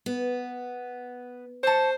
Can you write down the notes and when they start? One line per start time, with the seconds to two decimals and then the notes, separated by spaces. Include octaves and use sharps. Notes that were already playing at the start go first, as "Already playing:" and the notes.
0.06 B3
1.63 C5 A5 C#6